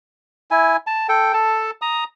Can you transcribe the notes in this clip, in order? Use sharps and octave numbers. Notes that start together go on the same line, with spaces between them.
E4 G#5
A5
A4 G5
A4 A5
A#5 D#6